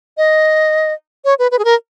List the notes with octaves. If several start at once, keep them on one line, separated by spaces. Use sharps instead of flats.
D#5
C#5
B4
B4
G#4
A#4